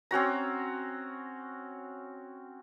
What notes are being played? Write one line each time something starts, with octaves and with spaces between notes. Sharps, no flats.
C4 C#4 F#4 A#5